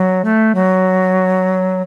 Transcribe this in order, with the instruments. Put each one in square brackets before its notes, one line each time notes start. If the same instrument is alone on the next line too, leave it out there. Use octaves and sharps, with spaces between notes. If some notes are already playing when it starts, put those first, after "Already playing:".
Already playing: [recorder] F#3
A3
F#3